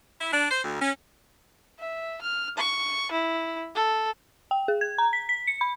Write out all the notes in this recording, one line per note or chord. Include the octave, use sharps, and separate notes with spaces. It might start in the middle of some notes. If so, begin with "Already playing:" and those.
E4
D4
C5
D2
C#4
E5
F6
C#6
E4
A4
G5
G#4
G#6
A#5
B6
B6
C#7
B5